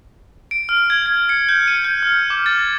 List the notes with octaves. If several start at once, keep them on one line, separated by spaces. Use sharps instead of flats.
D7
F6
G#6
G#6
C#7
G6
D#7
G6
F6
D6
A6